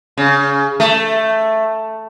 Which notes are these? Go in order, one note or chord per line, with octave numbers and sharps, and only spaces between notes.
C#3
A3